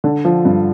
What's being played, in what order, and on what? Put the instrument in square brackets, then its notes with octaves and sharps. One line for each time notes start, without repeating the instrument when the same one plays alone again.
[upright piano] D3
F3
G2